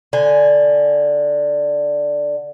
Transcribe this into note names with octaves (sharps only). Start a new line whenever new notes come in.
D3 G#5